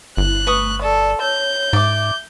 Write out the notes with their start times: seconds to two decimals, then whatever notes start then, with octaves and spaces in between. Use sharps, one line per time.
0.17 G1 E4 F#6
0.47 A3 B4 C#6 D#6
0.82 A4 D5
1.21 C#5 G6
1.73 G#2 D5 E5 D6